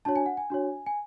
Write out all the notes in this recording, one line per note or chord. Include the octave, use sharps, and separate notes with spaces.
D4 F#4 C#5 A5
G#5
F#5
G#5
D4 F#4 C#5
G#5